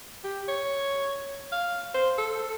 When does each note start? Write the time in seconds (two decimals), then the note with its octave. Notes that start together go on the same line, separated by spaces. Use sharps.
0.24 G4
0.48 C#5
1.52 F5
1.94 C5
2.18 A4